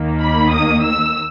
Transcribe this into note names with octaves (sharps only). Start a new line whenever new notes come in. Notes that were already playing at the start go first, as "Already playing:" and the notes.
Already playing: D#2 D#3 A#3
B5
D#6
E6